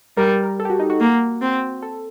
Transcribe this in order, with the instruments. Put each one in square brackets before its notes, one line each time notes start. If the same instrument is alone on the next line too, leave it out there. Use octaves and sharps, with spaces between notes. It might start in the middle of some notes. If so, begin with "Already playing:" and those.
[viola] G3 [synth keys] A#4
[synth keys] A#4
A4
G4
F#4
D#4
F#4
[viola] A#3
C4
[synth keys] A4